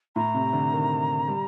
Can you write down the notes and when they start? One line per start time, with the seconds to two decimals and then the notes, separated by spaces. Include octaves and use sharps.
0.16 A2 A#5
0.34 C3
0.53 D3
0.72 D#3
1.28 G3